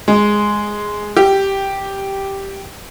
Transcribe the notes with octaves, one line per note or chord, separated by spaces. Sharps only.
G#3
G4